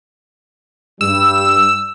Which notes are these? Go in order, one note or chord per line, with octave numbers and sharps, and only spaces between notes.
G2 G3 E6